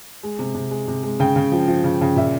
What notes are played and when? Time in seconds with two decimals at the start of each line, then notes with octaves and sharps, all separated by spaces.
0.23 G#3
0.39 C3
0.55 C3
0.71 G#3
0.88 C3
1.03 G#3
1.20 C#3 G5
1.36 C#3
1.52 F3
1.68 F3
1.84 C#3
2.01 C#3
2.16 A#2 E5